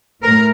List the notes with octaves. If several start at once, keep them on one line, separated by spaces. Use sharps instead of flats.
A2 A#4